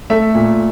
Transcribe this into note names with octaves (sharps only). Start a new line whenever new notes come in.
A3 E5
A#2